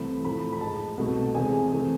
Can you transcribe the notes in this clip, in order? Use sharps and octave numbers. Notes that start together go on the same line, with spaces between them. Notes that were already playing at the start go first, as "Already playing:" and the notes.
Already playing: C2 C3 E3 A3 B5
A2 F3 A3 B5
B5
G#2 G#3 A5
C2 B2 A3
E2 C3 G#3 G#5
C3 E3 A3